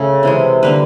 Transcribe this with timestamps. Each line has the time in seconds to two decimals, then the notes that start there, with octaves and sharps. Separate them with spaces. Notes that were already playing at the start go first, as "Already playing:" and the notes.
Already playing: C#3 A3 C#5
0.23 C3 E3 G#3
0.63 D3 G3 A#3 B4